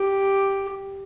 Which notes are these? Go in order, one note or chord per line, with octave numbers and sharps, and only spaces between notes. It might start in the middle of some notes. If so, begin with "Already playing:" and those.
Already playing: G4